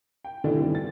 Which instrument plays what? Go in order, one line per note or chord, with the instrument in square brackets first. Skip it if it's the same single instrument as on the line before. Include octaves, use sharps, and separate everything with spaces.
[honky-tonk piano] G5
B2 D3 E3 A3 D4 D#4
E3 G3 C4 E4
A6